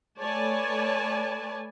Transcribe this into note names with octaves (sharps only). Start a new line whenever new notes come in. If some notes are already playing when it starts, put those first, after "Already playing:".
A3 B4 C#5 D5 G#5 A5